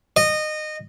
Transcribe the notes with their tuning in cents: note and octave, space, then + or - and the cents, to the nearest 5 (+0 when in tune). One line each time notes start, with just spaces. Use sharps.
D#5 -20